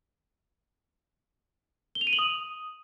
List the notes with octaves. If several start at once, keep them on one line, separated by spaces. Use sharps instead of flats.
G7
F7
D#7
F#7
D#6